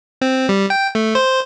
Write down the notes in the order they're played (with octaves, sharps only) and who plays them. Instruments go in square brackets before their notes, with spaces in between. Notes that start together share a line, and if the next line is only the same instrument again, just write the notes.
[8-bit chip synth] C4
G3
G5
A3
C5